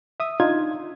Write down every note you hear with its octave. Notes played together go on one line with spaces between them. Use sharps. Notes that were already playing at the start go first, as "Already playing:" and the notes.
E5 D#6
D4 D#4 F4 G#6